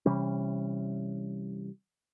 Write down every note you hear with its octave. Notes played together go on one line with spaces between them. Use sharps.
C3 E3 G3 C#4